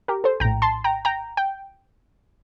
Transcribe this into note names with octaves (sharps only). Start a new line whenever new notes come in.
G4 A#4
A4 C5
A#1 A2 G5 A#5
A5 C6
G5 A#5
G5 A#5
G5